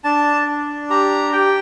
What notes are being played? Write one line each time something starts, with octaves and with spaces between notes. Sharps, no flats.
D4 A5
D4
G4 A#5
G4 G5